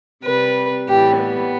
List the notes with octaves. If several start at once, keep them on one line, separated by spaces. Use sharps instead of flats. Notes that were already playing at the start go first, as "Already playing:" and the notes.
C3 G3 B4
A2 E3 G3 G4
B3